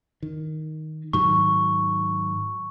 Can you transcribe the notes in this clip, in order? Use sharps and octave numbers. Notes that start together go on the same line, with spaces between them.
D#3
G#2 D#3 F#3 C#6